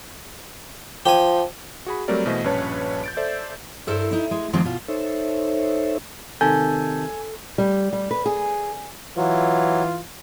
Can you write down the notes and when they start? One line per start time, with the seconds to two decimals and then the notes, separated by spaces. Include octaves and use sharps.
1.06 F3 G4 G#5
1.86 F#4 G#4 B5
2.08 F#3 G3 A3 C4 A#4 D5
2.26 B2 E3 A3 C5 D#5 B6
2.44 A#1 G2 C#4 B4 C#5 A5
3.04 G6 A6 D7
3.17 A4 C5 D5 E5
3.87 G2 E4 A4 A#4 C5
4.11 D#4 E4
4.31 G#3
4.53 D#3 F3 G#3 A#3 C4 D#4
4.65 B2 F4
4.88 D#4 A4 C5 C#5 E5
6.41 C3 D#3 A4 G#5 A5 G6
7.58 G3
7.93 G3
8.11 B4
8.26 G#4
9.17 E3 F#3 F4